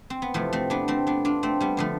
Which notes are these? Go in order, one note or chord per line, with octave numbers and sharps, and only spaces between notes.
C4
B3
E2 C3 E3 F3 A3
A3 C4
B3 D4
A3 C4
B3 D4
D4 F4
A3 C4
G3 B3
D3 F3 A3